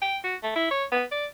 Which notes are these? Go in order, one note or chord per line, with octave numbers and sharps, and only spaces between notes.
G5
F#4
A3
E4
C#5
B3
D5